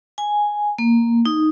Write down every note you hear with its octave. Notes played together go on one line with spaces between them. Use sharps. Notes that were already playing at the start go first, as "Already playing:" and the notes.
G#5
A#3
D#4